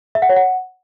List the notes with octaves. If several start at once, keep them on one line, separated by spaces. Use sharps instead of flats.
E5
F#5
C#5
F#5